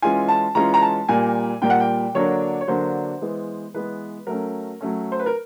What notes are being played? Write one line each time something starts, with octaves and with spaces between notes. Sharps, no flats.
E3 G#3 C#4 F4 G#5
A5
E3 G#3 C#4 F4 A#5
A#5
A5
A#2 G3 A#3 G#5
A#2 G3 A#3 G5
F#5
G5
D3 F#3 A#3 D4 C#5
C#5
D3 F#3 A#3 D4 C5
E3 G#3 B3
E3 G#3 B3 B4
F#3 A3 C#4 A#4
F#3 A3 C#4
C5
B4
A#4